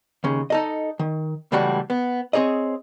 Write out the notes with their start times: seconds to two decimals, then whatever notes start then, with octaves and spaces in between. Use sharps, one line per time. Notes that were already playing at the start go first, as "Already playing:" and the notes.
0.24 D#2 C#3
0.50 D#4 A4 D#5
0.99 D#3
1.52 C#2 A2 E3 G3 F#4 F#5
1.90 B3
2.33 C4 G#4 C#5 D#5